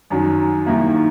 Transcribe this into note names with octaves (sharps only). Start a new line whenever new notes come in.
F#2 D#3 F#3
D#2 D#3 A#3 E4